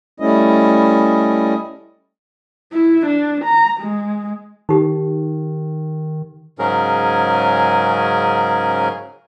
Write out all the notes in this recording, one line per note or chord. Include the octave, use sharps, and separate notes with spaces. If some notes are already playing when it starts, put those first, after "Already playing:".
G3 A3 C#4 E4 D#5
E4
D4
A#5
G#3
D#3 D#4 G4
G#2 C#3 F#3 C#4 G#4 A#4